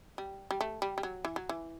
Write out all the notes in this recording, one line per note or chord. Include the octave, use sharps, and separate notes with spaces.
G3
G3
A3
G3
G3
F#3
E3
F#3
E3